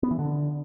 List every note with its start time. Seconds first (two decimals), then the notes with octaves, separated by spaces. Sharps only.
0.03 B3
0.11 E3
0.19 D3